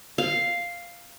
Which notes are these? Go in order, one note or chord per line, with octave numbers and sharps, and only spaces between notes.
F5